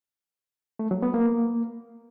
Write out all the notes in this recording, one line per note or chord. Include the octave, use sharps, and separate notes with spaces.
A3
F#3
B3
A#3